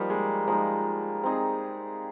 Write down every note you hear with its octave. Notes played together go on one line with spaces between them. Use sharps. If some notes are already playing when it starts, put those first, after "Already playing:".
Already playing: F3 G3 A#3 D#4
G#3
F3 G#3 A#3 D#4
C4 D#4 G#4